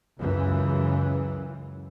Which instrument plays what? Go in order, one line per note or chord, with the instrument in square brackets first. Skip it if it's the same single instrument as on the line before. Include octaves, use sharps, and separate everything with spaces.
[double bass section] C#2 F#2 C#3 E3